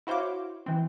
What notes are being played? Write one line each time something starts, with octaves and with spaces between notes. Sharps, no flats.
E4 F#4 C5 C#5 F5 D6
E3 C4